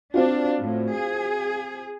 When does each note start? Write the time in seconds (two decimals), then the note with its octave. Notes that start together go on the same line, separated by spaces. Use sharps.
0.14 C4 D4 F4 F#4
0.60 A2
0.95 G#4